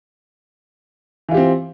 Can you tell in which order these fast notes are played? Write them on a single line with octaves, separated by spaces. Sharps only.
E3 F4 G4 C4